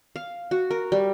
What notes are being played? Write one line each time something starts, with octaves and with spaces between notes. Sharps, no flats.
F5
F#4
A#4
G3